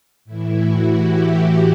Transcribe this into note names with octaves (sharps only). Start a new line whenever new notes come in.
A2 E3 E4
F#4
G4